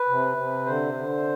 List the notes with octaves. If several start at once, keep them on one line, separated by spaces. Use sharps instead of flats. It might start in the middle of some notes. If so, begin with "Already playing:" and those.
Already playing: B4
C3
C3
D3 C5
D3